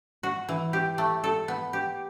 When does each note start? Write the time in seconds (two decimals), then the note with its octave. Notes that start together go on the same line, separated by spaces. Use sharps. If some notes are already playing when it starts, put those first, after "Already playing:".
0.23 F#4
0.49 E3
0.73 G4
0.98 A3
1.24 A4
1.48 B3
1.73 G4